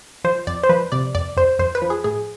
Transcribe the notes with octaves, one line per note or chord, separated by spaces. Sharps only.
F3 C5
F2 D5
C5
F3 B4
C3 D5
F2 D5
F2 C5
F2 C5
B4
F3
G#4
A2 G#4